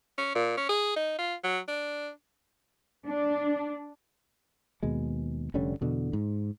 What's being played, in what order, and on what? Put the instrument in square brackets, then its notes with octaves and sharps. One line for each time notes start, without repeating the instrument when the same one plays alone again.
[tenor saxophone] C#4
A#2
C#4
G#4
D#4
F4
F#3
D4
[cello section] D4
[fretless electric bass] D#2 B2 G#3
F1 D3 G3 C#4
E2 B2 D3
G#2